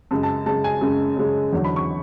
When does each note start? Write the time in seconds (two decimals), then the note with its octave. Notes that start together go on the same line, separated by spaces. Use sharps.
0.11 F#2 C#3 G#3 A5
0.23 A5
0.46 F#2 C#3 G#3 A5
0.64 G#5
0.81 F#2 C#3 G#3
1.16 F#2 C#3 G#3
1.53 E2 D3 F#3
1.64 B5
1.76 C#6